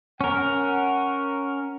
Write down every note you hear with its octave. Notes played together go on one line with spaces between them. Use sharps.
C#4 A#4 F#5